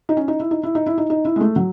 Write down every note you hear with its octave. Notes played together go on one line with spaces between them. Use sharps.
D#4
C#4
D#4
E4
D#4
E4
D#4
E4
D#4
D#4
E4
G#3
A3
F#3